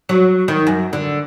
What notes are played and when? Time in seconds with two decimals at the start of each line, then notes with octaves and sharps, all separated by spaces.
0.09 F#3
0.48 D#3
0.67 F#2
0.93 D3